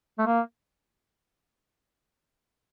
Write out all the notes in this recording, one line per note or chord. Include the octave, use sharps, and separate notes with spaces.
A3
A#3